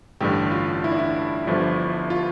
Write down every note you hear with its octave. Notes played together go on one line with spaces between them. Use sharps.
A1 G2 D3 G4
F4
E4
D4
E4
G1 G2 D3 F3
F4